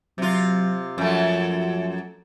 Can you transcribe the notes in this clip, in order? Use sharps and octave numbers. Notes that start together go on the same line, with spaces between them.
C3 F#3 F4
F#2 F3 A3